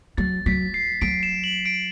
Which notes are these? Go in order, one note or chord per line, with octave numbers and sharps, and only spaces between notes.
F#3 A6
F#3 B6
C7
F#3 D7
E7
F#7
D7